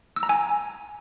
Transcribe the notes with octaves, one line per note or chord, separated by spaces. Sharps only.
E6
A#5
G#5